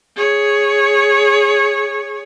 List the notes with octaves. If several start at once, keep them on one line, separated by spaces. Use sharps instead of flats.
G#4 C#5